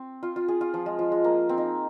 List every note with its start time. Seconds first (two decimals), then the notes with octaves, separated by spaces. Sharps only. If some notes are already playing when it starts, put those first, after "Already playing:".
Already playing: C4
0.23 F4
0.36 F4
0.48 G#4
0.61 F4
0.74 F3
0.86 G#3
0.99 F3
1.12 G#3
1.24 A#3
1.49 C4
1.58 D#4